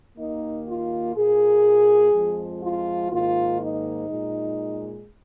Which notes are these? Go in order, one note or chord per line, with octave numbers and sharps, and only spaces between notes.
D#2 D#3 A#3 D#4
F4
A#2 A#3 G#4
F2 F3 G#3
F4
G#2 D#3 A#3 F4
D#4
A#2 G#3